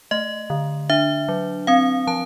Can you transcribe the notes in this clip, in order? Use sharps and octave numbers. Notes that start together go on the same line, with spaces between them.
A3 D#5
D3
D4 E5
F#3
C4 F5
F3 A5